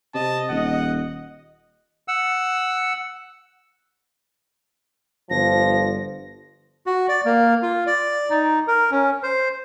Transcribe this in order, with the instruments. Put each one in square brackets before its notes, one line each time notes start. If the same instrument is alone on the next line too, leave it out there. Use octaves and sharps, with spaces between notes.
[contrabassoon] C3 [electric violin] D#5 [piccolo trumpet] A5
[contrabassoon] D#1 [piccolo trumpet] F#5
[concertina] F#5 E6
[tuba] G1 [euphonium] F3 [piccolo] A#6
[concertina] F#4
D5
A#3
F4
D5
D#4
A#4
C#4
C5